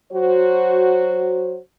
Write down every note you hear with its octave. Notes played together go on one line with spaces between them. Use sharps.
F#3 F#4 C5